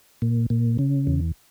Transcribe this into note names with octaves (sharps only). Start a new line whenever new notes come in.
A#2
A#2
C#3
E2